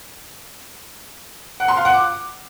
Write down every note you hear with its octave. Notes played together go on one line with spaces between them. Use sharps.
F#5
C6
F5
F#5
D6